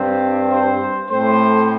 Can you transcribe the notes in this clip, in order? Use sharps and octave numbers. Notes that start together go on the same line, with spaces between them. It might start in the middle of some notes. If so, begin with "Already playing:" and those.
Already playing: G2 G3 C4 G4
C5
A2 A3 C4 C5